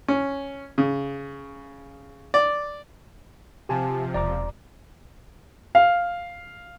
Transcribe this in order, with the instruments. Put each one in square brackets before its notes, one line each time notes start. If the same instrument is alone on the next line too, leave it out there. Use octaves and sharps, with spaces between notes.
[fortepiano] C#4
C#3
D5
[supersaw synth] C3 F3 [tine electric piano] G4 G#5 A5
[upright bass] E1 [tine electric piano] D5 A#5 D6
[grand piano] F5